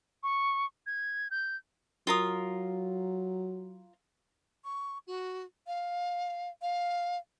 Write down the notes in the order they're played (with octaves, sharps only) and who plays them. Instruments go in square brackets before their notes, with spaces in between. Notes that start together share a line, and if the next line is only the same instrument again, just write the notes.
[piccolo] C#6
G#6
G6
[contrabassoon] F#3 [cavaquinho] F4 A#4 D#6
[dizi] C#6
F#4
F5
F5